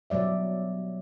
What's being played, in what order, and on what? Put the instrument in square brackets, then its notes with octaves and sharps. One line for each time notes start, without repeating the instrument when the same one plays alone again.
[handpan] B2 F#3 G3 D5 E5